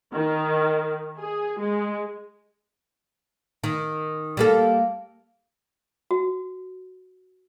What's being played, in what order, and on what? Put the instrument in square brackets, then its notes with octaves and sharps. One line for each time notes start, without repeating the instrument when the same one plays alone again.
[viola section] D#3
G#4
G#3
[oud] D#3
G3 A#3 A4
[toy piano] F#4